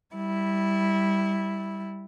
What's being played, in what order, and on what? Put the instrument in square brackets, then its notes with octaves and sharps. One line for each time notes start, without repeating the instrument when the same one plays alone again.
[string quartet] G3 E4